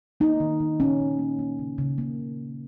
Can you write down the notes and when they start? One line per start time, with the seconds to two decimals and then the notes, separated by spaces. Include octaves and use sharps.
0.20 A#3 D#4
0.40 D#3
0.60 D#3
0.80 A#2 C#4
1.00 A#2
1.19 A#3
1.39 A#3
1.59 C#3
1.78 C#3
1.98 A#3